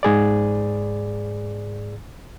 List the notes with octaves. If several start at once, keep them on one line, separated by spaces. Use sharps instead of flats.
G#2 G#4 D5